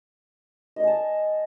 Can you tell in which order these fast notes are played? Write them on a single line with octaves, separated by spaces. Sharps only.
D#5 D5 G#5 A5